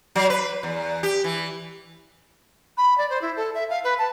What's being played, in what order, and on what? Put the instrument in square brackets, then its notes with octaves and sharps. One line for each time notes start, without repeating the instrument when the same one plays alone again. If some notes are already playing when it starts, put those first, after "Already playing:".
[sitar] F#3
B4
E2
G4
E3
[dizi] B5
D5
C5
E4
A4
E5
F5
B4
A5